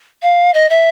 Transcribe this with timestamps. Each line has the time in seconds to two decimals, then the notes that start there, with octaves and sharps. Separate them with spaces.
0.22 F5
0.54 D#5
0.69 E5